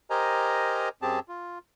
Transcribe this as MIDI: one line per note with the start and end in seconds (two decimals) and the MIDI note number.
0.10 0.89 67
0.10 0.89 70
0.10 0.89 72
0.10 0.89 75
0.10 0.89 80
0.10 0.89 82
1.02 1.19 42
1.02 1.19 60
1.02 1.19 67
1.02 1.19 68
1.02 1.19 81
1.28 1.59 65